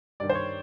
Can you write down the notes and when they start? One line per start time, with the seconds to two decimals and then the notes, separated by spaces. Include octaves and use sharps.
0.20 G2 D#3 G3 D5
0.30 C5
0.35 C#5